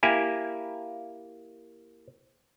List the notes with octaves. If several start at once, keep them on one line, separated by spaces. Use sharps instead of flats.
A#3 E4 G4 G#5